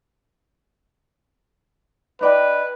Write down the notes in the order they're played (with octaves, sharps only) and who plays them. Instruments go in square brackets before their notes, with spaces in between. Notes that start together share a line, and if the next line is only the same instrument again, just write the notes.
[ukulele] D#4 D5 G5 [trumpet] B4